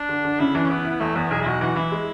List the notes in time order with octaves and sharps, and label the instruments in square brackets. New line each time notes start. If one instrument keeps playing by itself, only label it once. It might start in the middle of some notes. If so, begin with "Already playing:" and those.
Already playing: [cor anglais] D4
[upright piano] D3
D3
[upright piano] C#3 [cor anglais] E4
[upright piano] E3 [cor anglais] D4
[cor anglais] C#4
[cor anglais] B3 [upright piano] E4
[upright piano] E4
[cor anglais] B3
[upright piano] E2 [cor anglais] A3
[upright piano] E2 [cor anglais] B3
[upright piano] B1 [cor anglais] G#4
[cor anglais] E4
[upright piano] B1 [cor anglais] F#4
[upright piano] E3 [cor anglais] F#4
[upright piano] E3 [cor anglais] E4
[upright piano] G#3